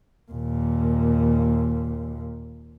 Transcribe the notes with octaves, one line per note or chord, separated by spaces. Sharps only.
D#2 A#2